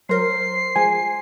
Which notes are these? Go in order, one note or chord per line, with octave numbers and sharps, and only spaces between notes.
F#3 A#4 C5 C7
F3 G#3 G#5